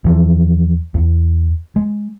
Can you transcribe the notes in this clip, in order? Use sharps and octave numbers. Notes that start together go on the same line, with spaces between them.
E2 E3 F3
E2
G#3